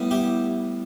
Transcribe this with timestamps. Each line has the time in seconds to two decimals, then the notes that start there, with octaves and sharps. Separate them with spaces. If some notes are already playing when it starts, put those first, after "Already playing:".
Already playing: A2 G3 B3
0.11 E4 G4